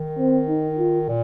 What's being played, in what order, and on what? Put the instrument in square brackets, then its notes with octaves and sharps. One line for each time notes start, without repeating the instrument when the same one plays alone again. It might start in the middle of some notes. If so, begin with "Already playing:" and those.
Already playing: [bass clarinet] D#3
[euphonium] C4
D#4
F4
[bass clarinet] A#2